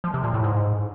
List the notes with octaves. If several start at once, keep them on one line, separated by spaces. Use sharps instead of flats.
F3
C3
A#2
A2
G#2